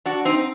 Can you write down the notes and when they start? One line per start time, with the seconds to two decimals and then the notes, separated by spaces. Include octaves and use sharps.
0.06 D4 F#4
0.25 C4 D#4